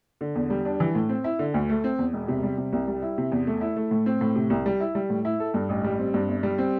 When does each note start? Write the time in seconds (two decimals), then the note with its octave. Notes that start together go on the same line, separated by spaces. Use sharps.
0.21 D3
0.35 E2
0.50 G3
0.65 D4
0.80 E3
0.95 A2
1.09 C4
1.24 E4
1.39 D3
1.54 D2
1.69 A3
1.84 C4
1.99 E2
2.13 E1
2.28 C3
2.43 G3
2.57 C3
2.73 C2
2.88 G3
3.02 E4
3.18 C3
3.32 E2
3.47 A3
3.61 E4
3.76 A3
3.91 A2
4.06 C4
4.21 A2
4.35 C3
4.50 C2
4.66 G3
4.80 E4
4.95 G3
5.10 A2
5.25 E4
5.40 A4
5.54 G2
5.69 A1
5.84 G3
5.99 C4
6.14 G2
6.28 G1
6.43 G3
6.58 C4